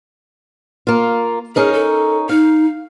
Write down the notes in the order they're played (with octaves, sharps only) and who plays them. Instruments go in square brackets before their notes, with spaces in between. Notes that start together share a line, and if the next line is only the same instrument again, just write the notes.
[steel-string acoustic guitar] A#3 F4
[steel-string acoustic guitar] C#4 D#4 A#4 [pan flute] G#4
[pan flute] A4
[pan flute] D#4 [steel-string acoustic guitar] F5